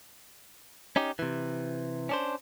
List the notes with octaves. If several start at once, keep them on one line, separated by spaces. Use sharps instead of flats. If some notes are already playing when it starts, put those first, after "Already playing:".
C#4 D#4 G4
C3 E3
C#4 D4 C5